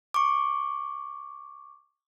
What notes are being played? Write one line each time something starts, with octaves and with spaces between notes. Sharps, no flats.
C#6 D6